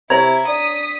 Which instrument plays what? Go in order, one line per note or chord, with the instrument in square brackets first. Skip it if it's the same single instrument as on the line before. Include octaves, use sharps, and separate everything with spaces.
[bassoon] C3 [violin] E4 [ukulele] C#5 A#5 [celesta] G#6
[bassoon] D4 [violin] D#6 B6